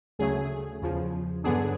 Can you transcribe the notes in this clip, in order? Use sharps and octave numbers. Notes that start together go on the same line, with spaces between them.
D2 C#3 F#3 A3 G#4
E2 C#3 F3
G2 D3 F#3 B3 D4 G#4